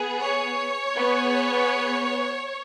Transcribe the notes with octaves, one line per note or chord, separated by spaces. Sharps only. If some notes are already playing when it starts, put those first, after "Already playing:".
Already playing: B3 G#4
C#5
B3 G#4